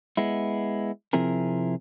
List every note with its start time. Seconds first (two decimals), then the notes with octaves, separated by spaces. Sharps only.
0.17 G#3 B3 E4
1.13 C3 F3 C4 E4 G#4 A#4